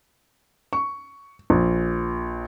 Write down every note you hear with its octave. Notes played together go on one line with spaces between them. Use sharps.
C#6
A#1